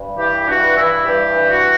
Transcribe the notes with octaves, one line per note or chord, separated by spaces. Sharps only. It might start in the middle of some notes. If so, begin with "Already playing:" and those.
Already playing: G2
E3 G4
G2 F#4
E3 E4
G2 G4
E3
F#4